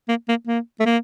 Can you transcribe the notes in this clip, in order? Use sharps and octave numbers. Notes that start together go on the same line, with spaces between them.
A#3
A#3
A#3
A3
A#3